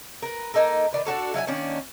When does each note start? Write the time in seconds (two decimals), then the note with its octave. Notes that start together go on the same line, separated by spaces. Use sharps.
0.22 A#4 B4
0.54 A#3 D#4 A4 A#4
0.93 D#3 D4 B4
1.05 D4 F#4 A4 C#5
1.34 F#3 E4 F5 G#5
1.47 D#3 A#3 C#4 D4